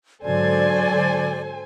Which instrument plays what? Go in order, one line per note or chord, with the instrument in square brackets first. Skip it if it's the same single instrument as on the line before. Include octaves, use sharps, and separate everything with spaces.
[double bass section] G#2 D3 F#3 [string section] A4 C5 G#5 [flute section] D5